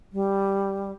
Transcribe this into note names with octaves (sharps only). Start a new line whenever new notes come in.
G3